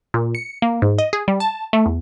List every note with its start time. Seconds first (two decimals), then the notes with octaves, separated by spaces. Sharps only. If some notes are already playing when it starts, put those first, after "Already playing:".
0.14 A#2
0.35 C#7
0.62 A#3
0.82 G#2
0.98 D#5
1.13 G#4
1.28 G3
1.40 A5
1.73 A3
1.86 E2